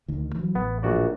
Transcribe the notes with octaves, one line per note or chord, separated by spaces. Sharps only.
D2 D#3
E3 F#3
A1 B3
A#1 F#4 D5